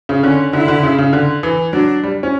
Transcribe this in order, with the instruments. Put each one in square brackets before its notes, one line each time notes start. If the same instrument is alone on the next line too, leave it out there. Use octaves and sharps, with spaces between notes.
[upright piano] C#3
[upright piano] D3 [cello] C#4
[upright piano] D3 [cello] E4
[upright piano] D3
C#3
C#3
D3
E3
[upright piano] F#3 [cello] D4
[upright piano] G3
C#4